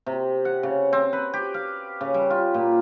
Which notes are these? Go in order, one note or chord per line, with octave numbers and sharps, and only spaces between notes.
C3
F#5
C#3
C4
B4
G4
F5
C#3
G3
F4
A#2